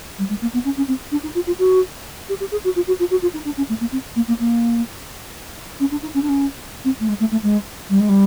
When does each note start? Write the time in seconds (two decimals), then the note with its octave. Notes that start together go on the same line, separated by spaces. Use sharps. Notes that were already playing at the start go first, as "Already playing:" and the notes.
0.18 G3
0.29 G#3
0.41 A#3
0.53 B3
0.64 C#4
0.77 C#4
0.88 C4
1.11 D4
1.23 D#4
1.34 F4
1.46 F4
1.58 F#4
2.29 G4
2.40 G4
2.51 G#4
2.64 F#4
2.75 F4
2.87 F#4
2.99 F4
3.10 F#4
3.22 F4
3.33 D#4
3.45 D4
3.57 C#4
3.69 A3
3.80 A#3
3.92 C4
4.15 A#3
4.28 A#3
4.39 A#3
5.79 C#4
5.91 D4
6.02 D#4
6.14 C#4
6.22 D4
6.28 C#4
6.84 C4
7.00 A3
7.08 G#3
7.19 A3
7.31 A3
7.42 G#3
7.89 G3
8.00 G#3
8.09 G3